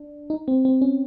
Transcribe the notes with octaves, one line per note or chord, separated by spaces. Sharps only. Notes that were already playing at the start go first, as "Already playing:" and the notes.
Already playing: D4
D#4
C4
C4
C#4